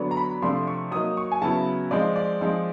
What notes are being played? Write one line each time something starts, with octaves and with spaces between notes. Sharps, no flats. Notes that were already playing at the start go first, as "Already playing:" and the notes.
Already playing: D3 F#3 B3 D4
A#5
B5
C3 F3 A3 D4 C6
C#6
F#3 A#3 D#4 D#6
C#6
G#5
C#3 F#3 B3 E4 A5
F3 G#3 C4 D#4 D5
D5
F3 G#3 C4 D#4